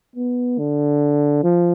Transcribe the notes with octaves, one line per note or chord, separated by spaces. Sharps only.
B3
D3
F3